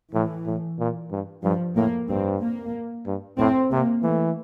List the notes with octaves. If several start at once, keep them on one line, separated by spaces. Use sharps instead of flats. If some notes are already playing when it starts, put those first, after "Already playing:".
A2 E3
A2
A#2
G2
G2 F3
A2 A#3
G2 C4
A#3
G2
A2 C4
C3 A#3
E3 A3